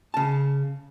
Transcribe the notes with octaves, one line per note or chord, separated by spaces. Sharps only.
C#3 A5